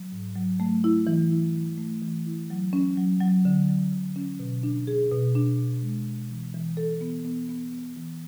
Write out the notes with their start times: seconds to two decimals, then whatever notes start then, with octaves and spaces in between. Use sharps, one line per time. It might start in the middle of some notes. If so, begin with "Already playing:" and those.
Already playing: F#3
0.12 G#2
0.36 F#3
0.60 A3
0.84 E4
1.07 E3
1.31 E4
1.54 E3
1.78 A3
2.02 E3
2.26 E4
2.50 F#3
2.73 C#4
2.97 F#3
3.20 F#3
3.45 D3
3.69 F#3
3.92 D3
4.16 C#4
4.40 B2
4.63 D4
4.87 G#4
5.11 B2
5.35 D4
5.59 B2
5.82 G#3
6.06 B2
6.30 E3
6.54 E3
6.77 A4
7.01 B3
7.25 B3
7.49 B3
7.72 B3
7.96 E3